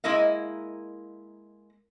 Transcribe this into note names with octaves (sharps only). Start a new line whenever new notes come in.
G#3 A#3 E4 A#4 D#5 F5